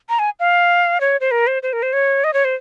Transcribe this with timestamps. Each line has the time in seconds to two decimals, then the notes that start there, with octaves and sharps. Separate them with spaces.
0.09 A#5
0.19 G#5
0.40 F5
1.01 C#5
1.21 C5
1.31 A#4
1.47 C5
1.63 C5
1.73 A#4
1.83 C5
1.93 C#5
2.24 D#5
2.34 C#5
2.45 C5